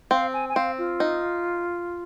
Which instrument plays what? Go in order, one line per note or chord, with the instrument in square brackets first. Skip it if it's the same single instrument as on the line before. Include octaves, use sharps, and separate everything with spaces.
[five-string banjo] C4 [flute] F5
[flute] G#5
G#5
[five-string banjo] C4 [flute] F5
[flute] F4
[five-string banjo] D#4